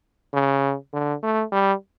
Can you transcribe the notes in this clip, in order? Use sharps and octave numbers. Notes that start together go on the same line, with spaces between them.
C#3
D3
A3
G3